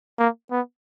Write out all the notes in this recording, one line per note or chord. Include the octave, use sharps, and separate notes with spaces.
A#3
B3